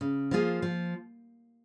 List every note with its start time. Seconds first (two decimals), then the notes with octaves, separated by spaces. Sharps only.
0.01 C#3
0.31 F3 A#3 F4 G#4
0.62 F3